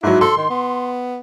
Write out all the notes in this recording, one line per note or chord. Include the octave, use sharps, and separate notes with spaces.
G#2 F#3 E4
A4 C6
D#3
B3